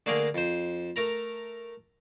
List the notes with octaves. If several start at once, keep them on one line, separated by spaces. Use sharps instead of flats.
D3 A3 A#3 G#4 A#4
F2 C5
A3 A#4 A#5